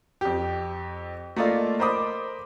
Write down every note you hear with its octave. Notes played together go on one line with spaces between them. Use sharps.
F2 G4
A3 A#3 F4 D5 D#5 F5
A#4 C5 D#5 B5 D6 D#6